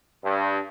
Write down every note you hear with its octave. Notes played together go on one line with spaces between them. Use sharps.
G2